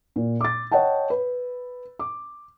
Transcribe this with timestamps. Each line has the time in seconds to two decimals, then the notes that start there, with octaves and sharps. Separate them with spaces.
0.16 A#2
0.41 D6 A6
0.72 C#5 D#5 F#5 G5 A5
1.10 B4
1.99 D6